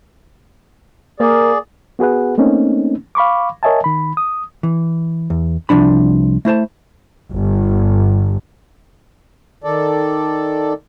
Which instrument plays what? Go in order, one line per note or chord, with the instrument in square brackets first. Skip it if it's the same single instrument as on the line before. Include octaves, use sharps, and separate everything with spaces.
[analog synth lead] A#3 [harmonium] G#4 D5
[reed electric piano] B3 F#4 G#4 B4 F#5
A3 A#3 C4 C#4 D#4
F5 B5 C#6 D6
A#4 C#5 D#5 E5 G#5 A5
D#3 B5
D#6
[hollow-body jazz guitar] E3
E2
C2 F3 D4 B5
A3 E4 C5 A5
[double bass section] G1
[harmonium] D#3 A4 D5